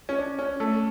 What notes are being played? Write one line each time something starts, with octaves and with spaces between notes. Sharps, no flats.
C#4
D4
C#4
A3 A4